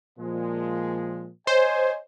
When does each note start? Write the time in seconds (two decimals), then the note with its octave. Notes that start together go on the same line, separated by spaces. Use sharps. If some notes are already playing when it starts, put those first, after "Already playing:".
0.19 A#2 F3 G#3
1.47 C5 C#5 D#5 G#5